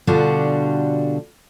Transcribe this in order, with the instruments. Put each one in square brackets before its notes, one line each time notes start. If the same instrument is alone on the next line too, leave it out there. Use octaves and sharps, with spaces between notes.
[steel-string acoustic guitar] B2 D3 G3 D4 F4 F#4